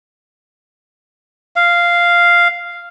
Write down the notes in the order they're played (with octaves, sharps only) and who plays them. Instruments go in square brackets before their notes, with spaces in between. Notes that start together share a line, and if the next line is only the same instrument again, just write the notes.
[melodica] F5